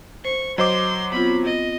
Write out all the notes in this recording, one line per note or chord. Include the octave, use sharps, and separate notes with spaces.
C5 C#6
F#3 C5 D#5 C6 D6
B3 C4 F4 B5
D#5